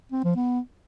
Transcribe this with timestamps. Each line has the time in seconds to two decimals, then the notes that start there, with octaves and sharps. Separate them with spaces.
0.12 C4
0.24 F3
0.36 B3